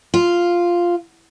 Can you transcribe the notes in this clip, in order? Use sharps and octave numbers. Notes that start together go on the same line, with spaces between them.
F4